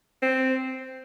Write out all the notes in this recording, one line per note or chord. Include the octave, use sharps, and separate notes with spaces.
C4